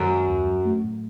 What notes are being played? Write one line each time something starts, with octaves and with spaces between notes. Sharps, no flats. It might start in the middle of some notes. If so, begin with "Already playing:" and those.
Already playing: F#2 D#3
G#3
D#2
F#3
A3
A2